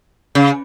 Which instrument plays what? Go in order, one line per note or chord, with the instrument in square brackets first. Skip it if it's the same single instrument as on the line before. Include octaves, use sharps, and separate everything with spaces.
[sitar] C#3